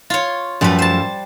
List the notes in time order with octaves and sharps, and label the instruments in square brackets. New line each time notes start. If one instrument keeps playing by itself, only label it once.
[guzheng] F4 C#5
[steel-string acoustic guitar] F#2 F3 A3 [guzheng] G3 B4
[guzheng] C5 A5